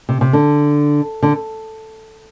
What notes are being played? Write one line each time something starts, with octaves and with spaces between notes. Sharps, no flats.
C3
C3
D3
D3